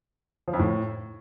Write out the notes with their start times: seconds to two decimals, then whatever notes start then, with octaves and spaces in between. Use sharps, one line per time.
0.48 F3
0.53 F2
0.59 A2